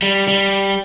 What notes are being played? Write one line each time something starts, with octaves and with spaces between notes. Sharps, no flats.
G3
G3